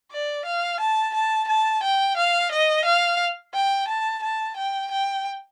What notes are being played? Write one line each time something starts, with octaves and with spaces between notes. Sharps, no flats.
D5
F5
A5
A5
A5
G5
F5
D#5
F5
G5
A5
A5
G5
G5